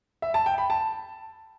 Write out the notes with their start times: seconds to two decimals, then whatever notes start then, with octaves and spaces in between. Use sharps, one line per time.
0.22 E5
0.34 A5
0.46 G5
0.58 B5
0.70 A5